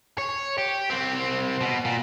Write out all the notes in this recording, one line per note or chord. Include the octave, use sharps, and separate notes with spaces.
C#5
G4
C2 C4
B2
A#2